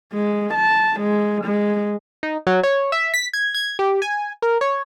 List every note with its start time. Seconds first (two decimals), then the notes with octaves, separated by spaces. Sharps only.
0.14 G#3
0.54 A5
1.00 G#3
1.45 G#3
2.23 D#4
2.47 F#3
2.63 C#5
2.92 E5
3.14 B6
3.33 G#6
3.54 G#6
3.79 G4
4.02 G#5
4.42 A#4
4.61 C#5